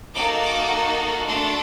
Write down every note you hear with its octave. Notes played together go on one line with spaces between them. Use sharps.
A#3 D#4 F#4 A4 D6
D6
A3 D4 F#4 A4 C6